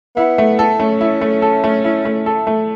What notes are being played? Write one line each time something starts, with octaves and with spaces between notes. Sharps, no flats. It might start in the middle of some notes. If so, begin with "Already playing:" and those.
B3 E4
A3
A4
A3 C#4
E4
A3
A4
A3
E4
A3
A4
A3